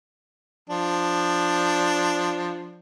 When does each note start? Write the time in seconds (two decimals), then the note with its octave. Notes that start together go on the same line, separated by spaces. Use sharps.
0.70 F3 D4